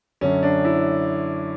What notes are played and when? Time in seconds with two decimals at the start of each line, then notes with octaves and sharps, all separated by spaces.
0.21 F#2 D3 C#4
0.43 D4
0.65 E4